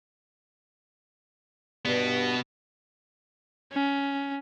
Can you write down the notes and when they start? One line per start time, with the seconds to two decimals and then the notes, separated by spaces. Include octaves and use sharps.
1.85 G2 B2 B3
3.72 C#4